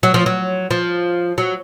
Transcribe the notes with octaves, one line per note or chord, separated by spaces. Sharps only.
F#3
F3
F#3
F3
F#3